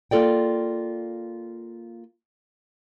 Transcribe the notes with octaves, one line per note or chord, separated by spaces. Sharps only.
A#3 F4 A4 D5 G5